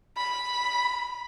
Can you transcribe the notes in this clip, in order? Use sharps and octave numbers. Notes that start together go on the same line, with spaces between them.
B5